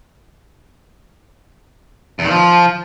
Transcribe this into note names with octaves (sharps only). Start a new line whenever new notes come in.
E2
D#3
F3